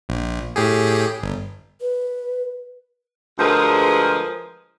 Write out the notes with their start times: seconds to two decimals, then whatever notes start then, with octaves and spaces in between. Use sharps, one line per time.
0.09 A#1
0.56 A2 G4 G#4
1.23 G1
1.81 B4
3.38 D2 F3 G#3 G#4 A#4 B4